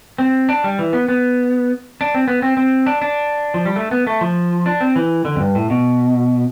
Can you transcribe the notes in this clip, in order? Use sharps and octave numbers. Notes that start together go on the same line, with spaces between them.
C4
D4
G3
E3
B3
B3
D4
C4
B3
C4
C4
D4
D4
F3
G3
A3
B3
A3
F3
D4
C4
E3
D3
F2
G2
A2
B2